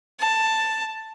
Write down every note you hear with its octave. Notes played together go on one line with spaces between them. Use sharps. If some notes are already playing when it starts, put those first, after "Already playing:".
A5